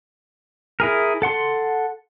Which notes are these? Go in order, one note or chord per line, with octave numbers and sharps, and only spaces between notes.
E4 G#4 A#4
A4 F#5 C6